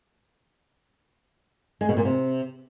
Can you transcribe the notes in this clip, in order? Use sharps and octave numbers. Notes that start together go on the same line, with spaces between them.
G#3
B2
A#2
C3